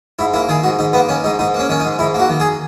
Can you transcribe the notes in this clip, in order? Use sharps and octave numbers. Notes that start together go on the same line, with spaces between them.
G#2 E4
A#3 E4
D#3 G#4
G#2 F#4
G#2 D#4
A#3 B3
D#3 C#4
G#2 D#4
G#2 D#4
A#3 C#4
D#3 C#4
D#4
G#2
G#2 E4
A#3 F#4
D#3
G#4